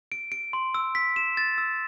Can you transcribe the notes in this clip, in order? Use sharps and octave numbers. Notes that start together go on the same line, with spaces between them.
D7
D7
C6
E6
B6
E7
A6
E6